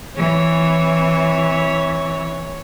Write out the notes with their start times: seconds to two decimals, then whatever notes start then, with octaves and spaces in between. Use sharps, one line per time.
0.16 E3 C4 C#5